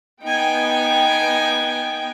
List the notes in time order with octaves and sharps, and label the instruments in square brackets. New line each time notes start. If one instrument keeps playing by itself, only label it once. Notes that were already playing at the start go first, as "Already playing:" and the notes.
[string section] B3 G5 [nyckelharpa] D#4 G#5